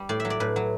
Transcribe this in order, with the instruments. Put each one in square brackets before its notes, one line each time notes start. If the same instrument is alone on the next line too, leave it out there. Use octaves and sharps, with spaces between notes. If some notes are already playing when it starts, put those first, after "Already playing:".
Already playing: [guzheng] G3
A2 D5
F#3 E5
D5
A2 B4
F#3